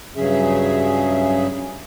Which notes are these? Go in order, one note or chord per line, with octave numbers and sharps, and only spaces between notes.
G2 C#3 F#3 C#4 G#4 E5